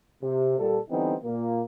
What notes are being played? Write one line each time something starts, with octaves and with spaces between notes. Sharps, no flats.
C3
A#2 G3 A4
D3 E3 G3 B3 C4 D#4
A#2 A#3